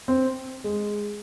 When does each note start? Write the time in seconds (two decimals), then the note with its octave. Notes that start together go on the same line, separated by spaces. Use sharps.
0.08 C4
0.64 G#3